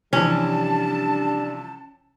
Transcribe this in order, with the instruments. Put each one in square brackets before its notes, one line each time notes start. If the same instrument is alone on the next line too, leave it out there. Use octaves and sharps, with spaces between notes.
[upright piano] C3 E3 F3 [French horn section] G3 D4 [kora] C#4 [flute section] A5